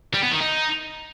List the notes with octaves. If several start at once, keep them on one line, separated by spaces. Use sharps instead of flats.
G3
B3
D#3
D#4